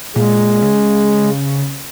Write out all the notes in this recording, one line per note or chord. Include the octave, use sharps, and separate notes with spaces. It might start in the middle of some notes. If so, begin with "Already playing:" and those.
A#2 G#3
C#3